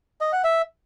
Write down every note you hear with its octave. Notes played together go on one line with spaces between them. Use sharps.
D#5
F#5
E5